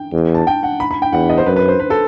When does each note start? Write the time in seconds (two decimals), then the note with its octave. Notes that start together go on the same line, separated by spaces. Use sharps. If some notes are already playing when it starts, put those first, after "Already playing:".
Already playing: G5
0.13 E2
0.34 A5
0.47 G5
0.63 F#5
0.80 B5
0.91 B5
1.02 G5
1.13 E2 F#5
1.30 D#5
1.38 C5
1.46 F#2 B4
1.56 B4
1.68 C5
1.80 B4
1.90 A4